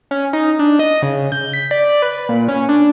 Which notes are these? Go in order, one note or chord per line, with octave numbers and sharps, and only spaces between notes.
C#4
D#4
D4
D#5
C#3
G6
B6
D5
B4
A#2
C#4
D4